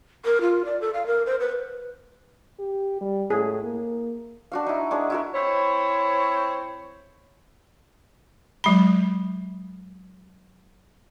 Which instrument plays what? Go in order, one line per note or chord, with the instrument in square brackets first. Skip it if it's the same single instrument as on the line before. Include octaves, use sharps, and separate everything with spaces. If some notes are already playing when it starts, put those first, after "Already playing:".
[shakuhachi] A#4
F4
D5
A4
F5
A#4
C5
B4
[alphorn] G4
G3
[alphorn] A2 [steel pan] G#4
[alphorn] A#3
[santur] D4 F#4 F5
D#4 E4
G#3 D4 C#5
E4 F#4 A#4
[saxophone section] C4 E4 C5 C#5
[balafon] F#3 G#3 B5